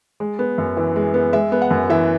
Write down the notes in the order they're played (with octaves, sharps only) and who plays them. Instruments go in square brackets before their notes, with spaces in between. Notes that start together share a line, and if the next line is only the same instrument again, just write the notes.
[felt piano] G#3
B3
F#2
E3
G#3
B3
G#3 E5
B3
F#5
F#2
E3 E5